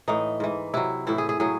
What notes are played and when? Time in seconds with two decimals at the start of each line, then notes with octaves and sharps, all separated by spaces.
0.08 A2 E3 D#4
0.40 G#2 E3
0.74 C3 F#3 E4
1.07 A2 E3 E4
1.18 G#4
1.29 G#4
1.40 A2 F#3 G#4